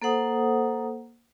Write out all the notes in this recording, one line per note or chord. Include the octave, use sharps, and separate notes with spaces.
A#3 A4 C5 F#5 D#6